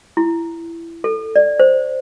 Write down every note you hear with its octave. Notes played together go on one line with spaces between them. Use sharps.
E4
A4
D5
C5